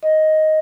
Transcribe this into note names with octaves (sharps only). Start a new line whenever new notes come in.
D#5